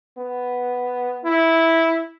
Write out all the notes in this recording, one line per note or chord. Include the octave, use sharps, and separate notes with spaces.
B3
E4